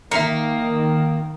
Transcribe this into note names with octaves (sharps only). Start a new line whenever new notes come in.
D#3 A#3 E5 A#5 C#7